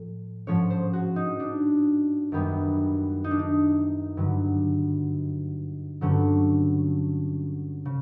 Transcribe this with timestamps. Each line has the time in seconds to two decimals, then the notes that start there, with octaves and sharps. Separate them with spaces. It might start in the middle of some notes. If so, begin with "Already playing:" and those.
Already playing: A2 F3
0.47 G#2 F3 G#3 C#4 C#5
0.70 C5
0.93 F#4
1.16 D#4
1.40 D4
2.32 F#2 D#3 G3 B3 D4
3.24 D#4
3.31 D4
3.39 D#4
4.17 G2 D3 F#3
6.01 G2 D3 F#3 A3 C#4
7.85 C#3